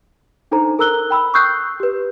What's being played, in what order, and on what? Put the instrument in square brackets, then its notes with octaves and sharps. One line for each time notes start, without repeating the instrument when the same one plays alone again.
[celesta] D4 D#4 A4 C5 A#5
A4 A#4 A#5 E6 F#6 G7
G5 B5 E6
C#6 D#6 E6 F#6 G6 C7
G4 B4